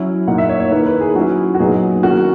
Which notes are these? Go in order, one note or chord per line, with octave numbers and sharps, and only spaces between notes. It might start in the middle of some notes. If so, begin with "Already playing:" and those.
Already playing: F#3 C#4 E4
A#2 A#3 D#4 F#5
E5
C#5
C#5
D#3 A#3 E4 B4
B4
G#4
F#3 C#4 E4 F#4
F#4
A#2 F#3 B3 D#4 G#4
D#3 A#3 C#4 E4 F#4